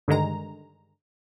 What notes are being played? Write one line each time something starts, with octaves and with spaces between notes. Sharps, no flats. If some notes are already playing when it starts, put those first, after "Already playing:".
G2 D3 D#3 G#3 A#5